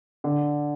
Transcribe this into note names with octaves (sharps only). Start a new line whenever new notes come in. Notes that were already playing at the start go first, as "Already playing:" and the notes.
D3